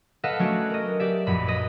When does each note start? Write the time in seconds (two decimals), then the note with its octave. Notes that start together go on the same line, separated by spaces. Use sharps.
0.23 A4 B4 D#5 F5 F#5 A5
0.39 F#3 A3 C#4 D4 F#4
0.70 A#4 D#5
0.99 G4 D5 E5
1.27 A#1 F#2 B5
1.46 B4 D#5 B5